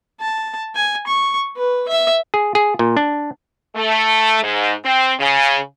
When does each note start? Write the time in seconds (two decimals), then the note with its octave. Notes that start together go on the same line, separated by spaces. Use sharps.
0.20 A5
0.76 G#5
1.07 C#6
1.56 B4
1.89 E5
2.34 G#4
2.55 G#4
2.79 A#2
2.97 D4
3.75 A3
4.42 G#2
4.84 C4
5.19 C#3